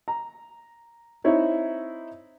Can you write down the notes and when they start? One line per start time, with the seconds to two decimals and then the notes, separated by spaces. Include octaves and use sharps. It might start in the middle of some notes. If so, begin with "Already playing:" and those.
0.08 A#5
1.24 C4 D#4 E4 C#5 E5